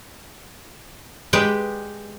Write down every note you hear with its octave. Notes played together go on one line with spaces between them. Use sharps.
G#3 G4 B4 D5 G5